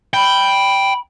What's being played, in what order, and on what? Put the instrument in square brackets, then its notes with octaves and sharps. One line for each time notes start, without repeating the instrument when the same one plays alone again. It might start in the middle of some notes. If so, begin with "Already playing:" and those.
[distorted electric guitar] G5 [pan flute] B5